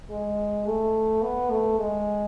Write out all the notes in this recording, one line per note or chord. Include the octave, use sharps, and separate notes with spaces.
G#3
A3
B3
A3
G#3